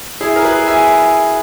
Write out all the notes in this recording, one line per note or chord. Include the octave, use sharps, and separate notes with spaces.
E4 G#4
A#4
G#4 B4
E5 G#5